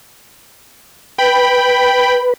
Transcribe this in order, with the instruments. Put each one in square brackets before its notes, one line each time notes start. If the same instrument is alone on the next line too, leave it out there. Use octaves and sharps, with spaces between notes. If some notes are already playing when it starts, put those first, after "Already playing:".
[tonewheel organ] B4 [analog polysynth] G5 B5